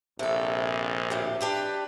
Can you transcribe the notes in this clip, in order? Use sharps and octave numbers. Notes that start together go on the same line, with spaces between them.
A#1 C3 A4
D2 A2 G4
D4 G4 B4